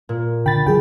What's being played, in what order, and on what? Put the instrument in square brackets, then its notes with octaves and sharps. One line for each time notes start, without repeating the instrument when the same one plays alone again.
[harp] A#2
[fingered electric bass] D3 [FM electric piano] G5 A6 [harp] B5
[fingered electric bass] D3 [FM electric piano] F#3 G#4 G5